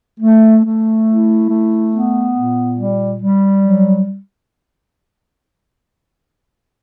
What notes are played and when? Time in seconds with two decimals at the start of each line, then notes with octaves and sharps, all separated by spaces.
0.20 A3
0.62 A3
1.05 E4
1.48 A3
1.91 B3
2.33 A#2
2.76 G3
3.19 G3
3.62 F#3